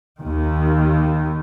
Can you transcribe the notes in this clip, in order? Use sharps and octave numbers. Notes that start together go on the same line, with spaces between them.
D#2 D#3